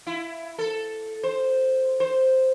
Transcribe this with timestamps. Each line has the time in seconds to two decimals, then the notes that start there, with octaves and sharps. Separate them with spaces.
0.07 E4
0.58 A4
1.23 C5
2.00 C5